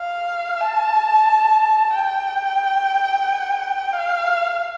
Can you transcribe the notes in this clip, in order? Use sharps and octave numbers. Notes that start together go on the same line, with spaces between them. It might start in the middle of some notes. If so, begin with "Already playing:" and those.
Already playing: F5
A5
G5
F5